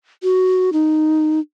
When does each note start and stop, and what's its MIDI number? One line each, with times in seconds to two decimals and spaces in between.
0.23 0.70 66
0.73 1.40 63